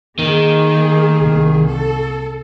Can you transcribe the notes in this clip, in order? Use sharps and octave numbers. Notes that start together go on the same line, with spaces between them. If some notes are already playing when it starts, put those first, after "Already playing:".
D#3 A#3 G#4
C2
A4